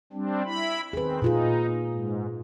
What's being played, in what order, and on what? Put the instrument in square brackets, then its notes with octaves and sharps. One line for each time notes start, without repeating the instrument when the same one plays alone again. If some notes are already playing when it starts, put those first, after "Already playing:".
[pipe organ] G3 C4 D4
E4 B5
[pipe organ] D#3 C4 [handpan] G#4 B4
[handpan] A#2 F4 G#4 [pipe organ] D#4
[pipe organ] G#2